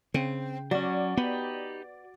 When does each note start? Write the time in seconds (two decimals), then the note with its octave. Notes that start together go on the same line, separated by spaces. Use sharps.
0.14 C#3 C4
0.71 F#3 C#4 F#4 D5
1.17 B3 D#4 G4 B5